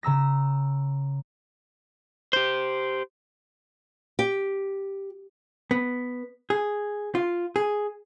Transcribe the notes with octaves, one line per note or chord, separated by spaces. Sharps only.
C#3 A#5 E6 A#6
G4 C5
G4
B3
G#4
F4
G#4